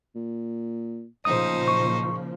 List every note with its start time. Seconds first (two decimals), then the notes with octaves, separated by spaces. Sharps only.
0.15 A#2
1.25 A1 A#2 C#3 F3 D#4 C5 D#6
1.68 F#1 C#6